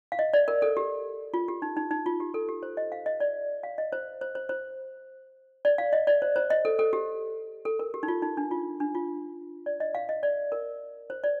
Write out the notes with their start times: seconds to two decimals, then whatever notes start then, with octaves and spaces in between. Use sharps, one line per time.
0.12 F5
0.19 D#5
0.33 D5
0.48 A#4
0.62 A4
0.77 G4
1.34 F4
1.48 G4
1.62 D#4
1.77 D#4
1.91 D#4
2.06 F4
2.20 G4
2.34 A4
2.49 G4
2.63 C5
2.77 D#5
2.92 F5
3.06 D#5
3.20 D5
3.63 F5
3.78 D#5
3.92 C5
4.21 C5
4.35 C5
4.49 C5
5.65 D5
5.78 F5
5.93 D#5
6.07 D5
6.22 C5
6.36 C5
6.50 D#5
6.65 A4
6.79 A4
6.93 G4
7.65 A4
7.79 A#4
7.94 G4
8.03 D#4
8.08 F4
8.22 D#4
8.37 D4
8.51 F4
8.80 D4
8.95 F4
9.66 D5
9.80 D#5
9.95 F5
10.09 D#5
10.23 D5
10.52 A#4
11.10 C5
11.24 D5